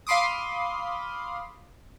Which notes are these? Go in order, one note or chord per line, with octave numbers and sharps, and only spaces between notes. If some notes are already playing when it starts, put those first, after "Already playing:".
F5 B5 C6 D6 D#6